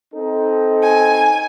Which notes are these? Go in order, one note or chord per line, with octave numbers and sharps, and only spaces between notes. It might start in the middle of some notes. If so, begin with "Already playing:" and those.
C4 D#4 A4
G#5